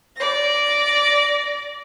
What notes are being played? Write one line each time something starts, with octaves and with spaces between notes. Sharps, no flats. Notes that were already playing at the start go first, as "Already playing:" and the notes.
D5 A#6